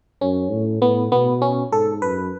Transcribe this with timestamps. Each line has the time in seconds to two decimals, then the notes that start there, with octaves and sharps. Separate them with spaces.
0.21 F#2 C#4
0.52 A2
0.82 A2 B3
1.11 B2 B3
1.42 C#4
1.72 G#2 A4
2.02 F#2 B4